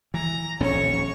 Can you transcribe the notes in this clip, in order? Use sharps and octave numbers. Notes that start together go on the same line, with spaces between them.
E3 A#5
D#1 A#1 C#4 C#5 C#6